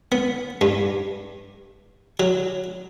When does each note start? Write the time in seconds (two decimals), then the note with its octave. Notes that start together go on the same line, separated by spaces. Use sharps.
0.12 B3
0.61 G2
2.20 F#3